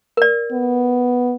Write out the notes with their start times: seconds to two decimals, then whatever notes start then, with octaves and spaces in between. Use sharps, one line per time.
0.17 A#4 D5
0.52 B3